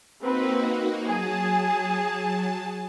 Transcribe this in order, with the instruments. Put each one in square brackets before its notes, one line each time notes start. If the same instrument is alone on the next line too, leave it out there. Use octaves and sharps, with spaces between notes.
[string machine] A#3 D#4 F#4 [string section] C4 B4
[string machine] F#3 A5 [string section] G#4